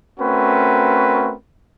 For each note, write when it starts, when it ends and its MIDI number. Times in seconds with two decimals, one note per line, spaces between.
0.20 1.34 57
0.20 1.34 60
0.20 1.34 61
0.20 1.34 66
0.20 1.34 70
0.20 1.34 71